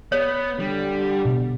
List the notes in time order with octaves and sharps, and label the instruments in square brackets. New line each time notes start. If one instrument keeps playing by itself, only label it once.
[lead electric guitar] B3 [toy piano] C#5
[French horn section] D3 G4 [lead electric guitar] G3
[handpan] B2